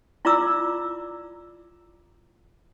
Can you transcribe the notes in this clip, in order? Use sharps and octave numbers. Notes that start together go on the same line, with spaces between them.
E4 F4 D5 A#5 D6 E6